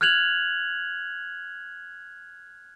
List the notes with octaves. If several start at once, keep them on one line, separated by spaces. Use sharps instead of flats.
F6 F#6 G#6 F7 F#7